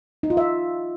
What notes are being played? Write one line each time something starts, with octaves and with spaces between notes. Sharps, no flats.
D#4
F4
E5